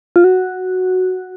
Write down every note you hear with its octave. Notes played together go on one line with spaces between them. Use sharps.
F4
F#4